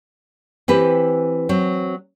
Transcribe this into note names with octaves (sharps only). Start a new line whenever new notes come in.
E3 C4 G4 B4
F#3 C4